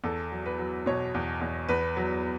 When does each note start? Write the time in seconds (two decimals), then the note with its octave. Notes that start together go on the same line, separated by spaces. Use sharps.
0.04 E2 A4
0.32 F#3
0.46 B4
0.59 F#3
0.86 B2 C#5
1.15 E2
1.41 E2
1.69 E2 B4
1.97 F#3